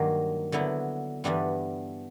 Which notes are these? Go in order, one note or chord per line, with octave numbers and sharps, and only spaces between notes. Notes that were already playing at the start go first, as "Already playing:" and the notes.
Already playing: G2 D#3 F#3 A#3
D3 F#3 B3 E4
G2 E3 G3 B3 D4